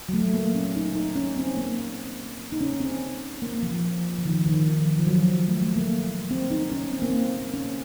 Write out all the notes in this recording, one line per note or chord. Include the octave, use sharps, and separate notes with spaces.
F#3
A3
A#3
C#4
D#4
D#4
C#4
C4
A#3
D#4
C#4
C4
A#3
F3
F3
D#3
D#3
F3
F3
F3
F#3
A3
A3
A#3
C4
D#4
C#4
C4
A#3
C4
C#4